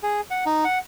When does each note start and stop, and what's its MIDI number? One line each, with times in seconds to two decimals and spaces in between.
0.03 0.21 68
0.30 0.44 78
0.46 0.64 63
0.65 0.79 78